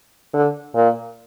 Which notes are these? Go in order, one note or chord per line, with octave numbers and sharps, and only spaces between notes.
D3
A#2